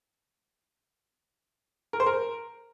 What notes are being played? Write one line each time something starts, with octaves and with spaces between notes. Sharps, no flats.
A#4
C5
A#4